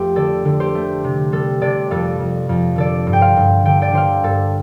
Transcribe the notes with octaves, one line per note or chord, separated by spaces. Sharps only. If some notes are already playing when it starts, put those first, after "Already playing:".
Already playing: F2 A3 G4 C5
D3 A4 D5
D3
G4 C5
A3
C3
G3 A4
C3 A4 D5
F2 A4 D5
F2
F2
D3 A4 D5
G2
G5
C5 F5
G2
D3 G5
D5 G5
D3 C5 F5
G2 A4